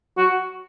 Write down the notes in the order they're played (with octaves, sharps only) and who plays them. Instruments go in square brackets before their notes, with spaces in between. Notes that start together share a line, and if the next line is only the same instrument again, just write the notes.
[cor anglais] F#4